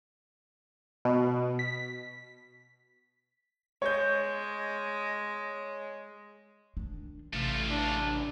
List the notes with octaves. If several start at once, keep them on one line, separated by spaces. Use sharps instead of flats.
B2
B6
G#3 C#5 G6
D#3 D4
A1 C3 A3 F4
D4